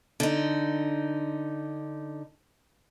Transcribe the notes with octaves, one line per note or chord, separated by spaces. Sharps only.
D3 D#4